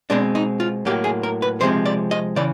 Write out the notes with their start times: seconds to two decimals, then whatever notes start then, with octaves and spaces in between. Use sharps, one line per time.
0.10 B2 G#3 C4 D4
0.35 D#4
0.60 F4
0.85 A2 F#3 A#3 G4
1.04 G#4
1.23 A#4
1.42 B4
1.61 C3 F3 G#3 C4 C5
1.86 D5
2.11 D#5
2.36 C#3 E3 D5